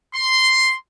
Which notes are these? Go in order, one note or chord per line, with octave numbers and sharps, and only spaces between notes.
C6